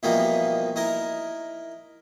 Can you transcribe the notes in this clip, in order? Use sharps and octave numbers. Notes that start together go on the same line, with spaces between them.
B2 E3 F3 G3 A#3 D#4
D#4 E4 A#4